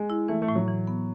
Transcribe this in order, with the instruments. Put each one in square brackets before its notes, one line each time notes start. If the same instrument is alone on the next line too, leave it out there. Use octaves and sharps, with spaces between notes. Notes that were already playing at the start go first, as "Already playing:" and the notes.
Already playing: [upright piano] G#3
[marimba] E4
[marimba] E3 [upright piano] A3
[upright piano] A3
[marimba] A2
[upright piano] F#3
[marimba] E3
B3